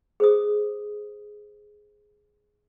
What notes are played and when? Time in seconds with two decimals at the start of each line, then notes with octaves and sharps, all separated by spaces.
0.20 G#4 C5 D#6